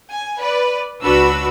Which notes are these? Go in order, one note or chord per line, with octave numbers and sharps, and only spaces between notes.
G#5
B4 D5
C#2 D4 F#4 B4 B5 E6